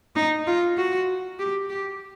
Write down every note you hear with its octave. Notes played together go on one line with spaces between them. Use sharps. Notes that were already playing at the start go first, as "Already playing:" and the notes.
D#4
F4
F#4
G4
G4